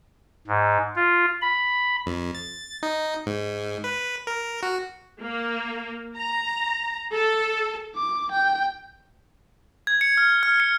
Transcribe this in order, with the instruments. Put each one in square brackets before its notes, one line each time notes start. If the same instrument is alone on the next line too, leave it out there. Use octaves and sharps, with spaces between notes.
[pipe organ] G#2
F4
B5
[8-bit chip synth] F2
A6
D#4
G#2
B4
A#4
F#4
[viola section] A#3
A#5
A4
[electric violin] D6
G5
[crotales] G#6
C#7
F6
F6
C#7